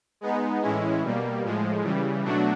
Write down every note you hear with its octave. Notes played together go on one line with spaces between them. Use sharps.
G#3 B3 D#4
A2 E3 G#3 C#4 E4
B2 G3 A#3
A2 F3 G#3
C#3 E3 G3
B2 F#3 A3 D4 F#4